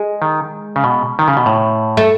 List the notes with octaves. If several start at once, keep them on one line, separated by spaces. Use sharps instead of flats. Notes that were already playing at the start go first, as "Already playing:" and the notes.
Already playing: G#3
D#3
C#3
B2
D#3
C#3
B2
A2
A3